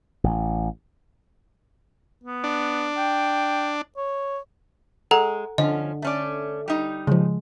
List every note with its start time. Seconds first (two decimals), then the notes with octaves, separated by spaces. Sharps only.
0.24 A1
2.23 B3
2.44 D4
2.97 G5
3.97 C#5
5.11 G#3 A4 F#5 G#5 A#5
5.58 D3 F3 C#4 D#5
6.02 A3 C#4 D5
6.68 G3 D#4
7.07 C#3 F3 G#3